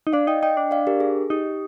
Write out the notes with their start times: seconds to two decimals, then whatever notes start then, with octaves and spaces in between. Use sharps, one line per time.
0.07 D#4
0.13 D4 D5 F5
0.27 D#4 D#5 G5
0.42 D#4 D#5 G5
0.57 D4
0.71 D5 F5
0.87 G4 A#4
1.00 G#4
1.30 D#4 G4